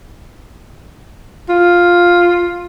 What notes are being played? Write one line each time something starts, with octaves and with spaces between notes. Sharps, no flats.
F4